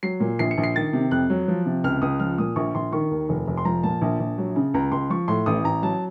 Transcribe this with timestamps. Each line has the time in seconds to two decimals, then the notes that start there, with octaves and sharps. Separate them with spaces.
0.03 F#3 C7
0.20 A#2
0.39 A#1 C7
0.51 C#7
0.57 A#1
0.63 C7
0.75 D#3 A6
0.93 C3
1.11 F2 F#6
1.30 F#3
1.48 F3
1.66 C3
1.84 C#2 F6
2.02 C#2 D#6
2.20 F3 F6
2.38 A#2 D#6
2.56 A#1 C#6
2.75 A#1 C6
2.92 D#3 C#6
3.11 D#2
3.29 F1
3.47 F1
3.57 C6
3.65 F3 A#5
3.83 A#2 A5
4.01 A#1
4.20 A#1
4.38 F#3
4.56 C#3
4.74 C#2 A#5
4.92 C#2 C6
5.10 F3 C#6
5.28 A2 C6
5.46 A1 D#6
5.64 A1 A#5
5.82 F#3 A5